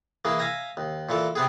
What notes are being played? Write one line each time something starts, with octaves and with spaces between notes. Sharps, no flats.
E3 A#3 G#4
E5 F5 G#5 A#5
D#2
A#2 E3 A4
C3 B3 G#4